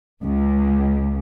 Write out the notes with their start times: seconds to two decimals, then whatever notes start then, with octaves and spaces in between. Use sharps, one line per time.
0.22 C#2